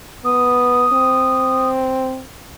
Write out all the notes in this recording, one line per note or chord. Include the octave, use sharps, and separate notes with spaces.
B3 D#6
C4